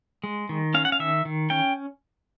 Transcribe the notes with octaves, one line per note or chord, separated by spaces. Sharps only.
G#3
D#3
C#4 F5
F#5
F5
D#3 E5
D#3
C#4 G5